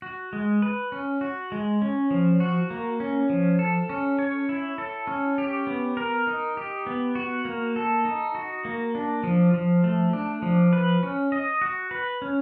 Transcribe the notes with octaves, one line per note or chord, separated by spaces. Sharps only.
F#4
G#3
B4
C#4
F#4
G#3
C#4
F3
F#4
A#3
C#4
F3
A4
C#4
C#5
E4
A4
C#4
G4
B3
A#4
D#4
G4
B3
F#4
A#3
A4
D#4
F#4
A#3
D4
F3
F3
A3
D4
F3
B4
C#4
D#5
F#4
B4
C#4